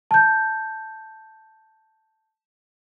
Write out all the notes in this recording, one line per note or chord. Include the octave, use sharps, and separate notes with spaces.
A5 G6